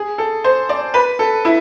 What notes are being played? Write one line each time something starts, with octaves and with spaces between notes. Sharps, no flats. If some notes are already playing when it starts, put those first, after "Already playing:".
Already playing: G#4
A4
C5
D5
B4
A4
E4